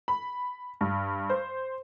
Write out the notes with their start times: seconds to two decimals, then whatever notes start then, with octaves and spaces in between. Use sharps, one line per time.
0.08 B5
0.81 G2
1.30 C5